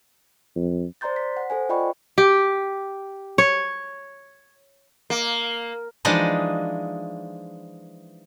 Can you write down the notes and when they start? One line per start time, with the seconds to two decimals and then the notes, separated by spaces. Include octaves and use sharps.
0.56 F2
1.01 C5 D5 A#5 C6 G6 A6
1.16 B6
1.37 F#5
1.50 A4 C5 G#5
1.69 F4 D5 D#5 G5 B5 C#6
2.18 G4
3.38 C#5
5.10 A#3
6.05 E3 F3 G#3 D4 D#4 D#5